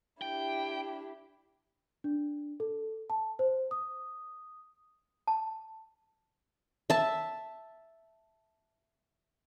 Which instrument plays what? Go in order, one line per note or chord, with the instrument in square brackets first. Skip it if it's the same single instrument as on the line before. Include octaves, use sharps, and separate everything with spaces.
[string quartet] D4 E4 G4 [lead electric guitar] G5
[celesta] D4
A4
A5
C5
D#6
[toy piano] A5
[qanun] E5 A5